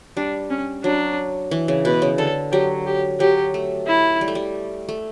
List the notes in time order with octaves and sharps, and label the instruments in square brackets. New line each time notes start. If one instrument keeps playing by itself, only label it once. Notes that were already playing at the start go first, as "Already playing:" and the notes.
[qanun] G3 [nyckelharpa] D4
[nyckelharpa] C#4
[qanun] F#3 [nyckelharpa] D4
[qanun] E3
C#3
[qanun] B2 [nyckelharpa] B4
[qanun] C#3
[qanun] D3 [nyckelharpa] A4
[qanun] F#3 [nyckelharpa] G4
[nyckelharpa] G4
[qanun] F#3 [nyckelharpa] G4
[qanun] A3
[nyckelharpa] E4
[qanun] G3
A3
G3
A3